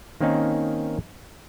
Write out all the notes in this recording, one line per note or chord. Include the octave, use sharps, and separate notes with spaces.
D#3 A#3 C4 C#4 D#4